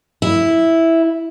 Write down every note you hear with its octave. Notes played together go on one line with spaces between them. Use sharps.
E4